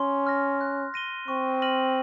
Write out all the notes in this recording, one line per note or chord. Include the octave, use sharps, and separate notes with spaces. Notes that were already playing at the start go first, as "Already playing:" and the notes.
Already playing: C#4 C6
F6 A#6
F#6
A#6 D#7 G7
C4 C#6
F6 A#6 D#7 F#7